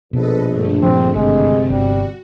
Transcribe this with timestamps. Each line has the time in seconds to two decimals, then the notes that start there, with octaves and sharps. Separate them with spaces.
0.13 A#1 B2 A4 B4 D#5
0.47 G2 D3 A3
0.83 A#2 F3 C4
1.15 G#1 C3 G#3
1.70 G1 G3 F#4